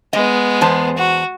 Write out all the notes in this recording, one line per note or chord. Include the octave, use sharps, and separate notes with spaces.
G#3 B3 D#5
E2 C5 A5
F#4